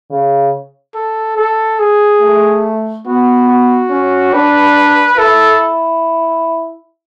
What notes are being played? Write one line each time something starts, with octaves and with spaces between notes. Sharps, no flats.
C#3
A4
A4
G#4
A3
B3 F#4
F#4
C#4
D4 B4
E4 A4